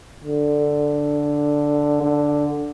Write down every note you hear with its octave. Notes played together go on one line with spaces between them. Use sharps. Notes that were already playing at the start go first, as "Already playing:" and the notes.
D3
D3